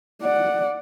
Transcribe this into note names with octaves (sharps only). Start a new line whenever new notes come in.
D5 F#5